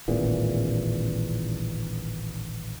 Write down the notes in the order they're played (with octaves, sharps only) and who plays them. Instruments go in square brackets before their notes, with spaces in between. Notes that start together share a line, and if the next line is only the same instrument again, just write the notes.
[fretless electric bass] D#1 A1 E2 A#2